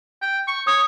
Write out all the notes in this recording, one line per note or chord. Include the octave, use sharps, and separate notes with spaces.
G5
C#6
C#5 D#6